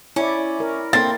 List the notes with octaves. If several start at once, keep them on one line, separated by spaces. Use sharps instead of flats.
C#4 E4 D5
E4 A#4 C#5
A#3 C4 A4 A6